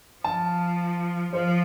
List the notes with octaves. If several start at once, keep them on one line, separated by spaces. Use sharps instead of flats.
F3 A5
F3 C5